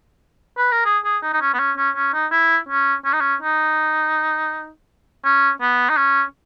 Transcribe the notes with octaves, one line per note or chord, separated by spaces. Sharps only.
B4
A#4
G#4
G#4
D#4
D#4
C#4
B3
C#4
C#4
C#4
D#4
E4
C#4
C#4
D#4
C#4
D#4
C#4
B3
D#4
C#4